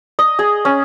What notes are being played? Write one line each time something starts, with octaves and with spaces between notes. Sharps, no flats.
D#5
G#4
C#4